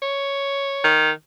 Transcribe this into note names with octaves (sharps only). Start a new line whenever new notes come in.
C#5
D#3